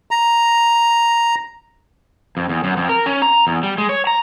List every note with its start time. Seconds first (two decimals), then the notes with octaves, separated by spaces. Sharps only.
0.11 A#5
2.37 F2
2.49 E2
2.64 F#2
2.77 F2
2.89 A#4
3.06 C#4
3.22 A#5
3.47 E2
3.63 G3
3.78 G#3
3.89 C#5
4.07 A#5